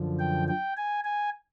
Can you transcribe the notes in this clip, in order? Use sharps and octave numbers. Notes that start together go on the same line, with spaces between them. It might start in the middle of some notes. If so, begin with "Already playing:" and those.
Already playing: F#2 D3 F3
G5
G5
G#5
G#5